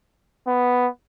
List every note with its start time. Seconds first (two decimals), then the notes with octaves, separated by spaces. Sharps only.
0.47 B3